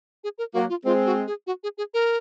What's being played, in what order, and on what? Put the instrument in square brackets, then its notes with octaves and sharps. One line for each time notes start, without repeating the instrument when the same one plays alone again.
[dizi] G#4
A#4
[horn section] F#3 A#3 [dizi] F#4
[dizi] F4
[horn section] G#3 C4 [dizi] F4
[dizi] F#4
G#4
F#4
G#4
G#4
A#4